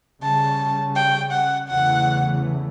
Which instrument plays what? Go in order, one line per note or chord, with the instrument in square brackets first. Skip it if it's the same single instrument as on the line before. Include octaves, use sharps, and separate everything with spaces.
[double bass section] C#3 G3 C#4 [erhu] A5
[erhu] G5
F#5
[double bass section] E2 C#3 E3 A3 [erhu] F#5